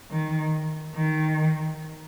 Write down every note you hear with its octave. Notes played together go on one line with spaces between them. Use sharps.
D#3
D#3